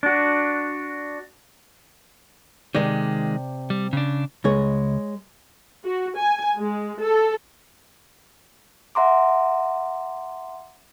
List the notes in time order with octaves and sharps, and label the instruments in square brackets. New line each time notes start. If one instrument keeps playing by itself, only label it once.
[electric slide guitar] D4 F#4
[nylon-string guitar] C3 D5 [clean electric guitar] D#3 G#3
[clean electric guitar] G3
C#3 D4
[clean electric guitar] C#2 [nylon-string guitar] G#3 G#4 C#5
[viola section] F#4
G#5
G#3
A4
[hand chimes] E5 F#5 A#5 C6 D6